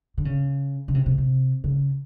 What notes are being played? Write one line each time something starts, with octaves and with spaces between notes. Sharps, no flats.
D3
C#3
C#3
C3
C3
C3
C#3